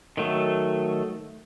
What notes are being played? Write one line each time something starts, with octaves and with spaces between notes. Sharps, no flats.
D#3 F#3 A3